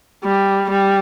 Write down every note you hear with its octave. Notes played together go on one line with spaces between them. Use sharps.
G3
G3